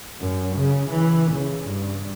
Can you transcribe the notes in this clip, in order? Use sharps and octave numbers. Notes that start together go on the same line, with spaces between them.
F#2
C#3
E3
C#3
G2